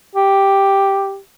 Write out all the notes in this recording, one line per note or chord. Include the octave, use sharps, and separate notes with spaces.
G4